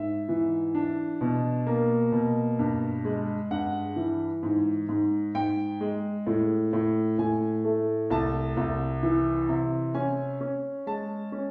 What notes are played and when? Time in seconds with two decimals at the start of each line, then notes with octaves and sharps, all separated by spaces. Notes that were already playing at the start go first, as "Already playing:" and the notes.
Already playing: G#2 E5
0.29 E3
0.75 D4
1.21 B2
1.67 A#3
2.12 B2
2.59 G2
3.05 G#3
3.51 G2 F#5
3.96 E3
4.43 G#2
4.89 G#2
5.35 G#2 G5
5.81 G#3
6.27 A2
6.73 A2
7.18 A2 G#5
7.64 A3
8.10 C2 A5
8.57 C2
9.03 E3
9.49 C3
9.94 C#4 G#5
10.41 C#4
10.87 G#3 A5
11.32 C#4